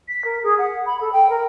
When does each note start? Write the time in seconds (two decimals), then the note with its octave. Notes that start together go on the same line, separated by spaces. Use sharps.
0.08 B6
0.25 A#4
0.43 G#4
0.58 F#5
0.86 B5
1.00 A4
1.13 G5
1.30 A#4